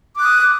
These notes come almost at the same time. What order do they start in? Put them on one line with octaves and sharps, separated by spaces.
D6 F#6 D#6